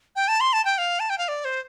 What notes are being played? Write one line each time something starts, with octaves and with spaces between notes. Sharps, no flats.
G5
A5
C6
A5
G5
F5
A5
G5
F5
D5
C5